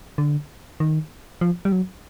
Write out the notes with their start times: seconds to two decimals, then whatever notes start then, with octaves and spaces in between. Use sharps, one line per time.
0.18 D3
0.80 D#3
1.41 F3
1.65 G3
1.72 F#3